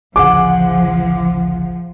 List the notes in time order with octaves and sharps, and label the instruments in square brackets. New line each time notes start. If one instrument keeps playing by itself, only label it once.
[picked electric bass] A1 D2 C#3 [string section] F3 [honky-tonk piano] G#4 F#5 [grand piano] D6